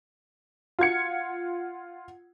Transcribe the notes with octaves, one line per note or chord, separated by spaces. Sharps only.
F4 F#5 G#6 C#7